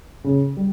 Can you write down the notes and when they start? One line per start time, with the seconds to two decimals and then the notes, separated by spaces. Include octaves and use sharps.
0.24 C#3
0.57 G3